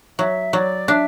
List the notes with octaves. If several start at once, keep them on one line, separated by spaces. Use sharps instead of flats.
F#3 E5
F#3 D5
D4 E5